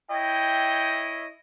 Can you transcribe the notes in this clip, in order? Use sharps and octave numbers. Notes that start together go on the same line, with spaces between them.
E4 C#5 D#5 G5